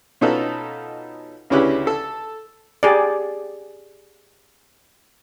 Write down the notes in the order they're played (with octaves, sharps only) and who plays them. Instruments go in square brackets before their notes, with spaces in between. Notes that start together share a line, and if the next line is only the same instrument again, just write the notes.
[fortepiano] B2 C#4 D#4 F4 A4 B4
D2 C#3 C#4 E4 G4 B4
A4
[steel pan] G4 G#4 D5